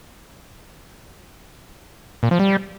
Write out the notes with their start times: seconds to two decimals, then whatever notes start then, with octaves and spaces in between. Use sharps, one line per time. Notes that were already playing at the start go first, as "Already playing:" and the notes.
2.23 A#2
2.31 F3
2.39 G3